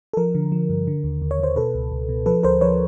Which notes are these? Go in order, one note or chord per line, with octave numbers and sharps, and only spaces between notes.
A4
F3 A#4
D3
F3
G2
D3
D#2
D#2
C#5
D#2 C5
B2 A4 B4
C#2
C#2
B2
F3 A4 B4
D2 A#4 C5
F3 B4 C#5